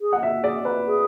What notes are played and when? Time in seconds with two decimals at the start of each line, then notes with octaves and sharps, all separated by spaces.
0.01 G#4
0.13 F#5
0.23 E5
0.43 G#4 D5
0.65 B4
0.87 G#4